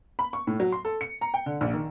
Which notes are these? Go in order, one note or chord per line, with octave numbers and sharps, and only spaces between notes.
B5
C#6
A2
F#3
C6
A4
C#7
A#5
G5
D3
A#1
D#3